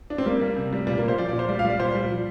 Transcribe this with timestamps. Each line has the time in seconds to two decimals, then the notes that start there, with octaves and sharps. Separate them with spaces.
0.10 D4
0.18 C4
0.26 G3 A#3
0.41 G3
0.57 C3
0.72 G3
0.87 A#2 G3
0.98 A#3
1.03 A#2
1.08 C5
1.18 F3 D5
1.29 D5
1.33 A#2
1.39 C5
1.48 G3 D5
1.59 F5
1.65 G3
1.70 D5
1.80 A#2 C5
1.95 G3
2.11 F3